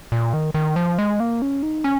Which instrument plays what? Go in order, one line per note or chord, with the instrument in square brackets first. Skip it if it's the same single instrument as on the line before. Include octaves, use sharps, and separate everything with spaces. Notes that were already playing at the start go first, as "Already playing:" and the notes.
[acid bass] A#2
D#3
D#3
F3
G#3
A#3
C#4
D#4
C#4